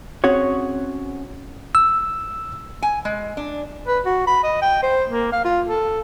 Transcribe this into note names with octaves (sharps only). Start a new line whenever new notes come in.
C4 C#4 F#4 G#4 C#5
E6
G#5
G#3
D4
B4
F#4
B5
D#5
G5
C5
A#3
F5
F4
A4